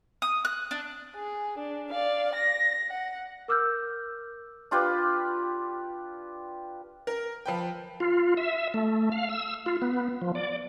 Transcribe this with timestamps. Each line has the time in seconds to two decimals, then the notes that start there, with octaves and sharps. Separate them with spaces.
0.22 D#6
0.45 F#6
0.71 D4
1.16 G#4
1.58 D4
1.91 D5 F5
2.35 A#6
2.90 F#5
3.48 A#4 D6 E6 F6 G6
4.71 D4 F4 G4 B4
7.07 A#4
7.46 F3 B4 G5
8.00 F4
8.37 E5
8.74 A3
9.12 F5
9.29 E6
9.66 F4
9.82 B3
10.21 F3
10.35 D5